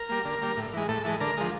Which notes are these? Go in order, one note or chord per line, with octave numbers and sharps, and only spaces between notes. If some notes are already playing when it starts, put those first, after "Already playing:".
Already playing: A#4
G3 A#3
D3
G3 A#3
A2
E3 G#3
A2 A4
E3 G#3
D3 A#4
F3 G#3